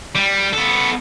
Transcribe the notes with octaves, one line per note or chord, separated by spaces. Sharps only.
G3
B3 A4